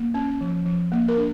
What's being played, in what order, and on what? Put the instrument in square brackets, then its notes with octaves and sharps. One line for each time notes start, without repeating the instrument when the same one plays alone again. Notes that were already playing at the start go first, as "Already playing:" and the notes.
Already playing: [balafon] A#3
C#4
F3
F3
A#3
A#4
D4